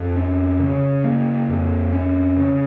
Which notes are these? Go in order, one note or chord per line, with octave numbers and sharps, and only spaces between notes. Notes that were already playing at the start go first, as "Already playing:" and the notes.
Already playing: F2
C#4
C#3
A#3
F2
C#4
C#3